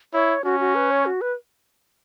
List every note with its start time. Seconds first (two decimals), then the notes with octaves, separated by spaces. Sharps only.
0.14 E4 C#5
0.44 C#4 F#4
0.60 F#4
0.75 B4
0.91 C#5
1.06 F#4
1.21 B4